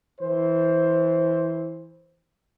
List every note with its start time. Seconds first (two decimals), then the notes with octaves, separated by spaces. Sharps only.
0.20 E3 C5